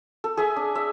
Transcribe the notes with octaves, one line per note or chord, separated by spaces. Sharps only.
A4
G#4 E5 G#5 D#6
D4
E5